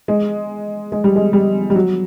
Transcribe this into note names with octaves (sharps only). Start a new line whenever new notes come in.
G#3
G#3
G3
G#3
G3
G3
F#3